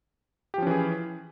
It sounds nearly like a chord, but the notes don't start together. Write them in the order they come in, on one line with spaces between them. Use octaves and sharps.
G4 F3 C#4 E3 G#4